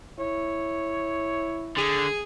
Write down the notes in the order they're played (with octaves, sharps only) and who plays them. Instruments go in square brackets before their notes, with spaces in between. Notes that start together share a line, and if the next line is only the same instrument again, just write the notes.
[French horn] E4 [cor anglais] C#5
[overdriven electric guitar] D3 [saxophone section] G#4